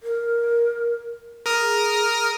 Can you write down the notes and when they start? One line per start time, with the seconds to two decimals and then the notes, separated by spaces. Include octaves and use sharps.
0.03 A#4
1.46 G#4 A#4 D#6 F6